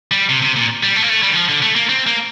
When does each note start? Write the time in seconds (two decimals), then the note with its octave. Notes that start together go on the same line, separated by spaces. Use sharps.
0.11 G3
0.29 C3
0.42 C3
0.56 A#2
0.83 G3
0.95 A3
1.02 A#3
1.10 A3
1.23 G3
1.30 D#3
1.35 F3
1.49 D3
1.62 A3
1.75 A#3
1.89 C4
2.06 A#3